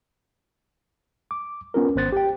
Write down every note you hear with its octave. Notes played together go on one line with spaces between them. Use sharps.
D6
B3 C#4 F4 A#4
G#1 B3 C5 F#6 A6
G4 G5